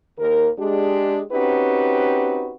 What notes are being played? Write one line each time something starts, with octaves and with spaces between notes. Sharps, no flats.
D#2 A#4
G#3 D4 G4
C4 C#4 D#4 F#4 G4 B4